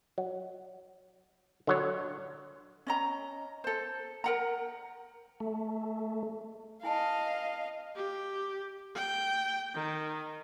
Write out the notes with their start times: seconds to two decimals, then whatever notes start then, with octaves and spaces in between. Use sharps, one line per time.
0.18 F#3
1.67 D3 F#3 C#5
2.87 C#4 D#5 A#5
3.64 A4 C5
4.24 A#4 F#5 A#5
5.40 A3
6.83 E4 D#5 F5 G#5 A5
7.96 G4
8.96 G5
9.75 D#3